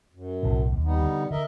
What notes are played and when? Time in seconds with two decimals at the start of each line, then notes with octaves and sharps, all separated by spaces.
0.13 F#2
0.43 B1 A2 C#3
0.72 D#2
0.84 G3 B3 D#4
1.02 D3
1.31 D3 A#4 D#5 E5